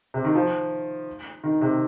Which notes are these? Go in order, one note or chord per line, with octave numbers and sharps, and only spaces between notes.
C3
D#3
F3
D#3
C3